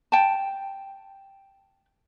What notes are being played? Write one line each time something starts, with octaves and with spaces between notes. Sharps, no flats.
G5 A5